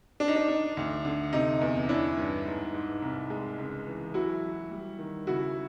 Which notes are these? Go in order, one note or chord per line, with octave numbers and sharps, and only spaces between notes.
D4
D#4
D4
D4
D2
D3
C3 D#4
E2
C#4 D4 E4
G2
G#2
G#2
C2
G#3
C#2
E3
F#3 E4 F#4
F#3
G3
D#3
C#3 E4 F#4